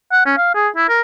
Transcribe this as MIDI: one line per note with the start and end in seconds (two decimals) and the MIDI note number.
0.12 0.21 78
0.26 0.34 61
0.37 0.54 77
0.55 0.68 68
0.76 0.88 64
0.89 1.01 70